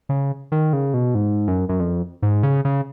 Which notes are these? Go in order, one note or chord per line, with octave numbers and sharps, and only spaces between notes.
C#3
D#3
C#3
B2
G#2
F#2
F#2
F2
G#2
C#3
C#3